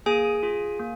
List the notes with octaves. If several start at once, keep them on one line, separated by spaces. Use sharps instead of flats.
A#3 G#4 G#5
F4 G#4
A#3